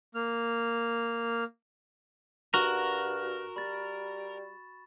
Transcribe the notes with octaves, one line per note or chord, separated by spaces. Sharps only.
A#3 F6
G2 F#4 A#4 C#6 E7 F#7
G3 B5 A6